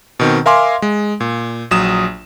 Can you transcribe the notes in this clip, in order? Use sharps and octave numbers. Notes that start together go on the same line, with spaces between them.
B2 D#3 C4
A#4 E5 F5 G#5 C6 D6
G#3
A#2
A#1 F#3 D#6 E7